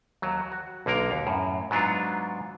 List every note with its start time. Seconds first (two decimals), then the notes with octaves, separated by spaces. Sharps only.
0.22 D#2 F#3
0.52 F#4
0.86 B1 D3 A#3 A#4
1.11 D#2
1.27 F#2 A2
1.71 G#2 F#3 B3 D4 F4